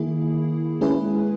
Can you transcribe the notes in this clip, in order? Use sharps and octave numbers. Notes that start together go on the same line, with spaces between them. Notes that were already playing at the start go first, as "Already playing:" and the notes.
Already playing: D#3 A#3 E4 G#4
G#3 C#4 E4 G#4 B4